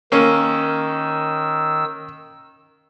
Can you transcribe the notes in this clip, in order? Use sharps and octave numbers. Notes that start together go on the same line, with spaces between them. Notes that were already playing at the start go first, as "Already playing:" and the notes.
D#3 A#3 C#4 E6